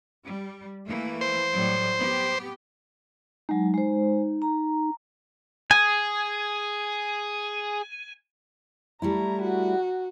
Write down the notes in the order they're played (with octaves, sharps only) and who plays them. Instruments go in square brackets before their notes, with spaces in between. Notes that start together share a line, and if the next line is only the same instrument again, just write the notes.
[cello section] G3
E3 A3 A#3
[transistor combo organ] C5
[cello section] A2 F#3 G3
B3 G4
[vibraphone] F#3 G#3 [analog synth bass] D#4
[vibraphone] G#3 C5
A#5
[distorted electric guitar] G#4 [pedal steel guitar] G#5
[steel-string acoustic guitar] G3 A3 E4 [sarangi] A#5
[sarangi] F#4